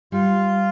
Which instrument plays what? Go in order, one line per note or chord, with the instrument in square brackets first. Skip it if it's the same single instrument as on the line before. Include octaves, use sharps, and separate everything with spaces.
[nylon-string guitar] G3 [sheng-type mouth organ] F4